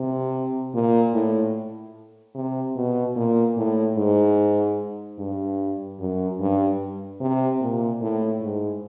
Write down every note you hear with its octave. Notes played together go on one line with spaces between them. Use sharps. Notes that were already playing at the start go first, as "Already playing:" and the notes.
Already playing: C3
A#2
A2
C3
B2
A#2
A2
G#2
G2
F#2
G2
C3
A#2
A2
G#2